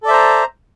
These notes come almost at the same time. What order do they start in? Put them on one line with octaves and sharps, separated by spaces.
A4 D5 E5 C5 A#5